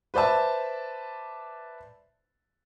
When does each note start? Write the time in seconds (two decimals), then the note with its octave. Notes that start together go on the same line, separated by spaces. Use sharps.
0.14 B4 C5 D5 E5 A5